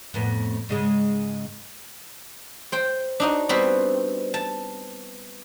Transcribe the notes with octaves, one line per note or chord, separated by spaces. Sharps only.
F2 A2 B3
G#2 C#3 G#3
C5 G5
D4 D#4 F#4
G3 B3 C4 F#4 B4 C5
A5